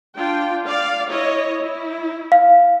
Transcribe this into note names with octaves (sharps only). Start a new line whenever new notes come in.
D4 F4 G5
D5 F5
E4 C#5 D#5
E4
F5